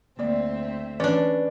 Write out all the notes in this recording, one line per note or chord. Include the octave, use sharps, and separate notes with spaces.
D2 A#3 C4 D5 E5
E3 C#4 D4 B4 D5